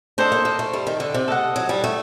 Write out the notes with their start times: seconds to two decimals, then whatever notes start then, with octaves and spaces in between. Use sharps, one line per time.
0.18 D4 A4 C5 D#5
0.32 A#3
0.45 A#3
0.59 A3
0.73 G3
0.87 D#3
1.00 D3
1.14 C3
1.28 A4 D#5 F#5
1.56 F#3
1.69 G3
1.84 A3